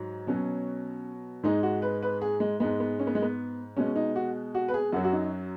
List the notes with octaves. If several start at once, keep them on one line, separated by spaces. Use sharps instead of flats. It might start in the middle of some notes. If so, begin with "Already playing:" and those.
Already playing: G#2 F#3
B2 F#3 C#4
G#2 G#3 D#4
F#4
B4
B4
G#4
G#3
G#2 G#3 B3
B3
C#4
B3
G#3
B3
B2 G#3 C#4
D#4
F#4
F#4
B4
G#4
F#2 F#3 F#4
F#4
D#4